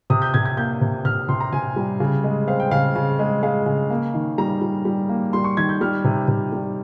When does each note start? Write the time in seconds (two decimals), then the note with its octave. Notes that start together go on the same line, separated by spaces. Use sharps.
0.10 C3 D#6
0.22 G6
0.34 C3 G#6
0.45 G#6
0.57 A#3 G6
0.81 C3
1.05 C3 F6
1.29 C3 C6
1.40 A#5
1.53 C3 G#5
1.76 G3
2.00 C#3
2.24 G#3
2.47 C4 F5
2.60 G5
2.71 C#3 F5
2.96 C#3
3.19 G#3
3.43 G#3 F5
3.66 C#3
3.90 A#3
4.14 D#3
4.38 G3 A#5
4.62 G3
4.85 G3
5.09 A#3
5.33 G3 C6
5.44 C#6
5.57 D#3 G#6
5.69 G6
5.81 G3 F6
6.04 C3
6.28 C3
6.52 G3